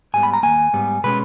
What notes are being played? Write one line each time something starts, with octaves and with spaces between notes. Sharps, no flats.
G#2 G3 B3 G#5
B5
A#5
D#2 D#3 A#3 G#5
G#2 G3 B3
B2 G#3 C#4 B4